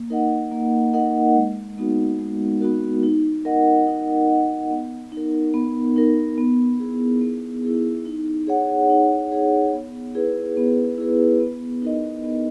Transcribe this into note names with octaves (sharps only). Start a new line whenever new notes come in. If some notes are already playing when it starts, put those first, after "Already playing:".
Already playing: A#3
D#4 A#4 D#5 F#5
A#3
D#4 A#4 D#5 F#5
G#3
B3 D#4 F#4 A#4
G#3
B3 D#4 F#4 A#4
D#4
A#4 D#5 F#5
D#4
A#4 D#5 F#5
B3
D#4
A#4
B3
D#4 A#4
B3
E4 G#4
B3
E4 G#4
D#4
G#4 C#5 F#5
D#4
G#4 C#5 F#5
B3
E4 G#4 B4
B3
E4 G#4 B4
B3
D#4 A#4 D#5
B3